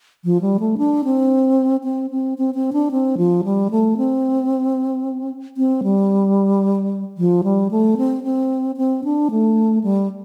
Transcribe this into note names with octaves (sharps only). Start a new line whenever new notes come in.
F3
G3
A3
D4
C4
C4
C4
C4
C4
D4
C4
F3
G3
A3
C4
C4
G3
F3
G3
A3
C4
C4
C4
D4
A3
G3